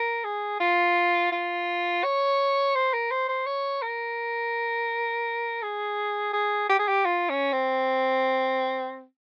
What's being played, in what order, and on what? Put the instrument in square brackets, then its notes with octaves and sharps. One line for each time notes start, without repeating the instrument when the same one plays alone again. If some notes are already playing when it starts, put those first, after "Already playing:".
Already playing: [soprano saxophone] A#4
G#4
F4
F4
C#5
C5
A#4
C5
C5
C#5
A#4
G#4
G#4
G4
G#4
G4
F4
C#4
C4